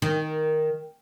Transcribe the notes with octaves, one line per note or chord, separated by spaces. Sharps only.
D#3